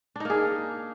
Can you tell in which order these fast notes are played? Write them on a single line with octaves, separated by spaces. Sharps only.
D4 D#4 A#3 G#4